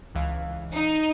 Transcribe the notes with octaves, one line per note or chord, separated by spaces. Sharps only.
C#2 E3 F5
D#4